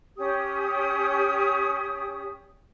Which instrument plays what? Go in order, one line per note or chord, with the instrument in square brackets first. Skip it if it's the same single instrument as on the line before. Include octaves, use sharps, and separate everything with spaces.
[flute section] C#4 G4 D#6